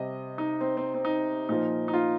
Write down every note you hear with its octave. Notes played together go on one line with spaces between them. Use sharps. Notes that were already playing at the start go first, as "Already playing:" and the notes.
Already playing: C3 G3 D#5
D#4
C4
C4
C4
D#4
A#2 F3 D#4
D#4
F4